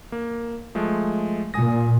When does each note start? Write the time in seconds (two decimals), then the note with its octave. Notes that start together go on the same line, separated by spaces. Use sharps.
0.12 A#3
0.75 F3 G#3 A3
1.54 A#2 G#5 D#6 A#6